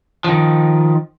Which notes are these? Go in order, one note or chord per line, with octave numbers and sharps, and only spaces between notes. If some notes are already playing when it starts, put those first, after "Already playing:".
D#3 F3